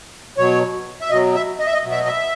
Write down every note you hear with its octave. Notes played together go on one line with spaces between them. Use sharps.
B2 F#3 C#5
E5
B2 F#3 D#5
E5
D#5
E5
D#5
B2 F#3
E5
D#5
E5